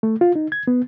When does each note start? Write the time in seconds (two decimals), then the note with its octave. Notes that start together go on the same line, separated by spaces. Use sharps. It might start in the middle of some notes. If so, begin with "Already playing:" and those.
0.03 A3
0.21 F4
0.36 D#4
0.52 G#6
0.67 B3